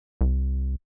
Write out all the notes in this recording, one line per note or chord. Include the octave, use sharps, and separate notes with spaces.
C2